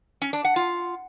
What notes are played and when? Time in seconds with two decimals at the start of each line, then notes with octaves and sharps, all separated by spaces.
0.22 C#4
0.33 D4
0.45 F#5
0.56 F4